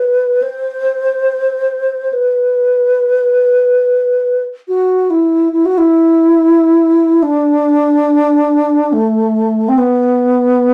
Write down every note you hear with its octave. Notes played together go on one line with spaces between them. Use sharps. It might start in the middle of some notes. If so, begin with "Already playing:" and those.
Already playing: B4
C5
B4
F#4
E4
E4
F#4
E4
D4
A3
C4
B3